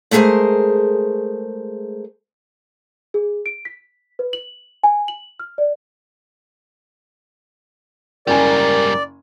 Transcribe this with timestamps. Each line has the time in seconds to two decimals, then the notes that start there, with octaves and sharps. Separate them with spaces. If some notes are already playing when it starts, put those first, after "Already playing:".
0.11 G#3 A3 B3 G#4 A#4 C5
3.14 G#4
3.46 D7
3.65 B6
4.19 B4
4.33 F#7
4.83 G#5
5.08 F#7
5.39 F6
5.58 D5
8.27 F#1 G#2 G3 A#4 D5 G#5